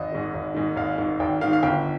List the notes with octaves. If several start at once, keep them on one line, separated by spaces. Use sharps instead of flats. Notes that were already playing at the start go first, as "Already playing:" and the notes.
Already playing: G#1 D#5
G#2 D#3
G#1
G#2 D#3
G#1 F5
G#2 D#3
G#1 G5
G#2 D#3 F5
F5
G1 G5